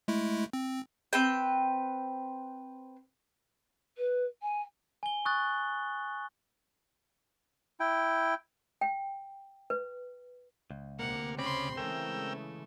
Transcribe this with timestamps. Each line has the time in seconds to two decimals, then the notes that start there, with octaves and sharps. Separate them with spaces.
0.08 G#3 A3 E4
0.53 C4
1.13 C4 B4 G5
3.97 B4
4.42 G#5
5.03 G#5 G7
5.25 C#6 D#6 F#6 A6
7.80 E4 G5
8.81 G5
9.70 B4
10.71 C#2
10.99 D2 C3 A#3 F#5
11.39 C#3 C4 B5 C6 D6
11.77 C#3 E3 G#3 A3 A#4 G5 E6